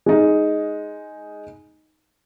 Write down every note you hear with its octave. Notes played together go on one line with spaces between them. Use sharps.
G#3 D#4